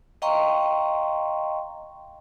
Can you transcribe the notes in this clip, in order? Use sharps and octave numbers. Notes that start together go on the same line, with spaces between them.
D#5 F5 G5 A#5 C6 C#6